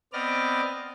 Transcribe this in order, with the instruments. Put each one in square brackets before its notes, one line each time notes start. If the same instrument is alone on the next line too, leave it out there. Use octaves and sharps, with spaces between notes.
[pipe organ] B3 C4 D5 D#5 F6